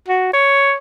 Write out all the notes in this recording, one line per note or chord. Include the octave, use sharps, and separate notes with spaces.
F#4
C#5